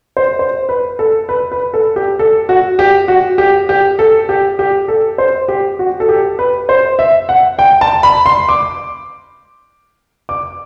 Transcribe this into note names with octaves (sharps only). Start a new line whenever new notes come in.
C5
C5
B4
A4
B4
B4
A4
G4
A4
F#4
G4
F#4
G4
G4
A4
G4
G4
A4
C5
G4
F#4
A4
G4
B4
C5
E5
F#5
G5
A5
B5
C6
D6
D6